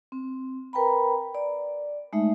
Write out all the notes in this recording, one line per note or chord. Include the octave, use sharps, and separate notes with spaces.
C4
A#4 B4 G5 A#5 B5
D5
G#3 A3 D#4 E5